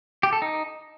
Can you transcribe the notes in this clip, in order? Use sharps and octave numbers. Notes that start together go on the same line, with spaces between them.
G4
A4
D#4